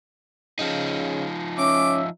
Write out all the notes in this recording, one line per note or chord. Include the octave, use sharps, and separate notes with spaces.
C#3 F3 D#4
C#4 E5 D6